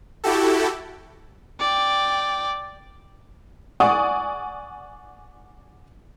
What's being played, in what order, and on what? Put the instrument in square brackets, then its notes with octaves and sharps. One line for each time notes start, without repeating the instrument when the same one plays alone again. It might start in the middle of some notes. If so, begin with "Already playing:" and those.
[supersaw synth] E4 F#4 G4 A4
[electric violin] D5 G5
[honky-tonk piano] D5 F#5 G#5 C#6 D#6